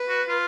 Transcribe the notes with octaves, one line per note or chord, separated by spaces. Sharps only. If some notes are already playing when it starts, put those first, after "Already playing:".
Already playing: B4
F#4
F4